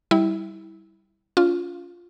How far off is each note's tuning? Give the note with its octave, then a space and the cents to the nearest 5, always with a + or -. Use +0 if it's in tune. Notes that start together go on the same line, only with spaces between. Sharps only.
G3 -5 E4 -20
C#4 +45 F4 +0